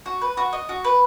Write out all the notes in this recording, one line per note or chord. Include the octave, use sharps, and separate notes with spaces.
F#4
B4
F#4
D#5
F#4
B4